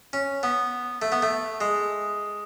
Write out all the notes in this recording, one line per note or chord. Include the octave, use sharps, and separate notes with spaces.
C#4
B3
A3
B3
A3
G#3